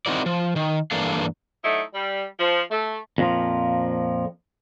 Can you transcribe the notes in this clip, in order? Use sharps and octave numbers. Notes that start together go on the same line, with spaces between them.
C4 D#4 E4 F#4 A#4 D5
F3
D#3
G2 E3 A#3 D4 A4 F5
F#3 A3 D#4 E4
G3
F3
A3
F2 A#2 F3